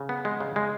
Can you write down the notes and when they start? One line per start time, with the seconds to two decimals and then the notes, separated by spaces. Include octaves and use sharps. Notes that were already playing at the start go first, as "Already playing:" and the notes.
Already playing: C#3
0.09 B3
0.25 G#3
0.40 C#3
0.56 G#3